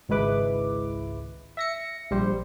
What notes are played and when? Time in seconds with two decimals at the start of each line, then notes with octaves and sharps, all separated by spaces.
0.09 G#1 C#2 G#3 E4 B4 D6
1.57 E5 A#6 C#7
2.11 A#1 G3 C5